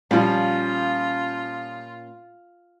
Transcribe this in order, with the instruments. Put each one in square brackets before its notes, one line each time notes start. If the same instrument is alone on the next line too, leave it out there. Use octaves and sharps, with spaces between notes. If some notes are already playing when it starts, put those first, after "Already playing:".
[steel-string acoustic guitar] A#2 C#4 F5 [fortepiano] F3 G3 [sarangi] F4